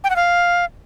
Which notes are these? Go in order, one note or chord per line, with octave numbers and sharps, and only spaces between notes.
G5
F#5
F5